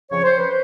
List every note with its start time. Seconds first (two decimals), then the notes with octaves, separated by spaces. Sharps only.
0.10 F2 C#3 F3 C#5
0.23 C5
0.37 B4